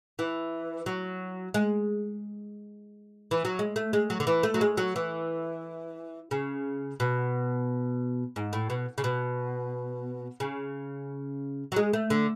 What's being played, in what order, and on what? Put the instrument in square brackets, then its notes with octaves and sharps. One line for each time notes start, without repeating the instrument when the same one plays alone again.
[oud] E3
F#3
G#3
E3
F#3
G#3
A3
G#3
F#3
D3
E3
A3
F#3
G#3
F#3
E3
C#3
B2
G#2
A2
B2
C#3
B2
C#3
F#3
G#3
A3
D3